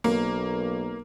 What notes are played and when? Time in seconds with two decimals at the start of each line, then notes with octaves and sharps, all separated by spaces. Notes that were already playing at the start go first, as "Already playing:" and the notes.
0.04 B1 A#3